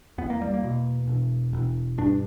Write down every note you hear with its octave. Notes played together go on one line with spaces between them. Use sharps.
E2 B3
A#3
G3
A#3
B2
E1
E1
G2 D4